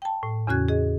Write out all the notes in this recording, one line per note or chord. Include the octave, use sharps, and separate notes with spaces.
G5 A5
A2
E2 C#3 C#4 F#4 F#6 G#6
G#4 D#5